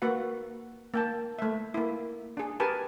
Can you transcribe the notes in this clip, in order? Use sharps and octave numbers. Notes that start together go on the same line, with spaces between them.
A#3 F#4 B4 F#5
A#3 G5 A5
A3 E5
A#3 E4
D4 G#4
G4 G#4 A#4 B4 G#5 A5